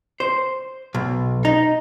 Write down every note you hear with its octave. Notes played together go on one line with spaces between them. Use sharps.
C5
B1
D#4